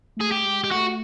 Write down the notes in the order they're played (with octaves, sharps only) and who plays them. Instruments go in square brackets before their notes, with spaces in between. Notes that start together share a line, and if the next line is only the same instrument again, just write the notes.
[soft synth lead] A3 [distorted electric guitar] G#4
[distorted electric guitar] G4
[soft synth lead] G#3
[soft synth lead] G#3 [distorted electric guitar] G4
[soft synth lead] A3 [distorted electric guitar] F#4